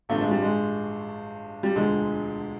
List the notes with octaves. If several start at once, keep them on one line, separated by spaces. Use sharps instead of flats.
A1 G2 D3 F3 A3
G#3
G3
G#3
G3
E1 D2 D3 F3 G#3